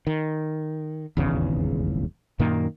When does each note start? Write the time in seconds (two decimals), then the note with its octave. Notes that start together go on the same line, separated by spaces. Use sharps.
0.07 D#3
1.17 D#1 G#1 E2 C#3
2.39 F#2 A#2 D#3 A#3